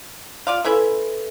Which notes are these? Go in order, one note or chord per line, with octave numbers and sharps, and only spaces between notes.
F4 D5 F5 C6
C#4 E4 A4 B4 E5 B5